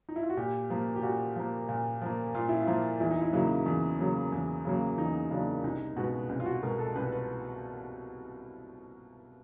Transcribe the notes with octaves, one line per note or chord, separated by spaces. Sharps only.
D#4
E4
F4
F#4
A#2 G4
F3 A#3
G4
A#2 F#4
F3 A#3
A#2
F3 A#3
A#2 F4
E4
F4
F3 A#3
E2 E4
D#4
E4
C#3 F#3 A#3
E2
C#3 F#3 A#3
E2
C#3 F#3 A#3
E2 D#4
C#3 F#3 A#3 D4
C2 D#4
B2 G#3 B3 F#4
C2
F4
F#4
B2 G#3 B3 A#4
A4
C2 B4
B4